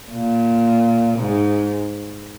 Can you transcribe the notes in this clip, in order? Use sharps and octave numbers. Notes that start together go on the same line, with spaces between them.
A#2
G#2